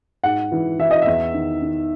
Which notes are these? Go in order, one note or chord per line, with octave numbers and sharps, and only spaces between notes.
G#2 F#5
E3
E3 E5
D#5
E2 E5
D#3
D#3